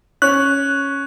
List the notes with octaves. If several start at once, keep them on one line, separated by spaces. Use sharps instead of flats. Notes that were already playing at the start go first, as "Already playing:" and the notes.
C#4 F#6